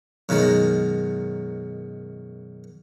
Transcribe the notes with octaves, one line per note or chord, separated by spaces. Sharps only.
F#2 B2 D#3 G#3